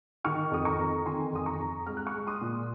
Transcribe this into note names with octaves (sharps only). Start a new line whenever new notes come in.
D#3 C#6 F6
F2 D#6
A#5 C#6
F2
D#3 G#5 C6
F2 D#6
A#5 C#6
F2
G#3 F6
F#6
C#6 F6
G#3
C6 D#6
A#2